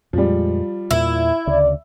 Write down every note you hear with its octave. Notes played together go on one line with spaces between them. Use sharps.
F2 A#2 F3 G3 G#3
E2 A#2 A#3 E4
D2 C#3 D5